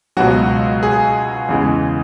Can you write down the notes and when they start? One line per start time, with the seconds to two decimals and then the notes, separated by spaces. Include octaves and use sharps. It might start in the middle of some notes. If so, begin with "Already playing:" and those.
0.17 C#2 B2 F#3 F#4
0.83 G#4
1.49 E2 C#3 E3 G#3